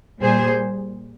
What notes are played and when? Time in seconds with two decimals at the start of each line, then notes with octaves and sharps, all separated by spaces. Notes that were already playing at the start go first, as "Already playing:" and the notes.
0.21 A#2 G3 G#4 C5